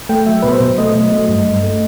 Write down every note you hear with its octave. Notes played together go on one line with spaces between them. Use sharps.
A3 G5
F#3 E5
B2 B4
C5
B2
A3 D#5
F#3
A3
G2
G2
A3